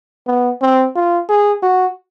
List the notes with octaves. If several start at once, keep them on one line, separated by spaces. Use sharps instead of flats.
B3
C4
F4
G#4
F#4